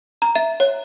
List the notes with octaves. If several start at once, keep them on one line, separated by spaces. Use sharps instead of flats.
A#5
E5
C#5